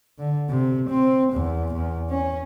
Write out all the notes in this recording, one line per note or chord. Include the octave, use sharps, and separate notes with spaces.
D3
C3
C4
E2
E2
C#4